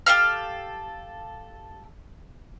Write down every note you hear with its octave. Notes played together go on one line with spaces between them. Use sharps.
G4 A4 F5 F6